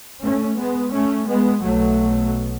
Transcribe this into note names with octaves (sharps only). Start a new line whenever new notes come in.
A3 C#4
G#3 B3
A3 C#4
G#3 B3
B1 B2 F#3 A3